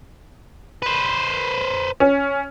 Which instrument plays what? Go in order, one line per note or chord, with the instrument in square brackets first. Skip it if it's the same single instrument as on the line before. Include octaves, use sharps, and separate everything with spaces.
[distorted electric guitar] B4 C5
[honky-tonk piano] C#4